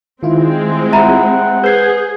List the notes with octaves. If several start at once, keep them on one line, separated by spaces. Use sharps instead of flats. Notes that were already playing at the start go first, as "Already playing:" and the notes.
D#3 G#3 C4 E4 F4
E5 F#5 A#5 B5
G#4 B4 C5 G6 G#6 C7